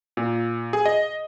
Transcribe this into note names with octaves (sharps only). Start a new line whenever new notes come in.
A#2
G#4
D#5